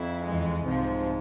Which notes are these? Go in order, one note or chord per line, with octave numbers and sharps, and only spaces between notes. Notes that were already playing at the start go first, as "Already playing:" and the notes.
Already playing: F2 E4
E2 E3 G#3
C2 G#2 C3 F3